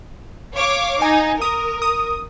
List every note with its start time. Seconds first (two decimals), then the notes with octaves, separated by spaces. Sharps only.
0.55 C#5 F5 D6
1.02 D#4 G#5
1.42 A#4 D#6
1.82 D#6